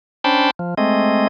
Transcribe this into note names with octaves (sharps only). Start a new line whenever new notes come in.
C#4 D4 C5 G5 A5 B5
F3
G#3 A3 C4 D#5